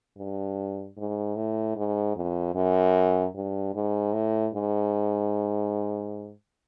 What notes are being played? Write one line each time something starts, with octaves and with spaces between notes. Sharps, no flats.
G2
G#2
A2
G#2
F2
F#2
G2
G#2
A2
G#2